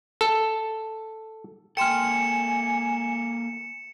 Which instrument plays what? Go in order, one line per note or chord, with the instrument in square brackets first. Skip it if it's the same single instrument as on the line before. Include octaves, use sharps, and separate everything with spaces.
[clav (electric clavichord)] A4
[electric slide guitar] A#3 A4 [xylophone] G5 C6 F6 [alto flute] G#5 [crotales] C#7 E7